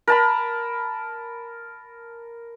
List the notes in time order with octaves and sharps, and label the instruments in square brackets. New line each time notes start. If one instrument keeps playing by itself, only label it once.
[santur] A#4 A5 B5